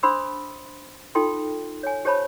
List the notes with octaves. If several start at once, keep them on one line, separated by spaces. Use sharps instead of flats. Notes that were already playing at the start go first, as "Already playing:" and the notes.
D4 C5 B5 C6 D#6 E6
D#4 F4 A4 G5 C6
C#5 G#5
G4 C5 C#5 A5 B5